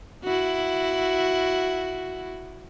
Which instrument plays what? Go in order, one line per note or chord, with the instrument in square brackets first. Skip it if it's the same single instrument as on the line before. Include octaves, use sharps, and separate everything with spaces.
[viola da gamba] E4 F#4